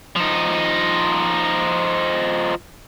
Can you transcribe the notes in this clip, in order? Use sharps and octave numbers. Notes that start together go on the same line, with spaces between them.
F3 D#4